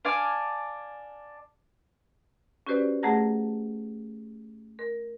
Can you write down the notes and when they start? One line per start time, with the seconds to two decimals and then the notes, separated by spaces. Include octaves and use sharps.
0.05 D4 F5 G#5 D6
2.67 C#4 F#4 G4 B4 C5 D5
3.03 A3 G#4 F#5 A5 A#5 A#6
4.79 A#4